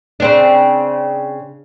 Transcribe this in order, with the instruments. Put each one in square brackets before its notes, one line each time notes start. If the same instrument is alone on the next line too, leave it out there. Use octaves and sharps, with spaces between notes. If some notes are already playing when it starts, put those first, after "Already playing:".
[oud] C#3 C4 D4